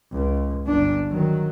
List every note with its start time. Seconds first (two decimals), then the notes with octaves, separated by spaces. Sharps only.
0.12 C#2
0.66 G1 D4
1.10 D#3 F#3